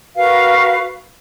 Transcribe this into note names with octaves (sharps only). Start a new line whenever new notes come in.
F#4 A#4 B4 F5